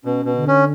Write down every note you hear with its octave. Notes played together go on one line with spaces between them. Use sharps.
B2 C#4
B2
D3
C#4